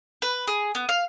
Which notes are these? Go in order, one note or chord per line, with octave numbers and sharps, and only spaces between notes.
B4
G#4
B3
F5